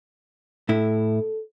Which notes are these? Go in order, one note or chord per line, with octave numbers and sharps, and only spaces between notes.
A2 E4 A4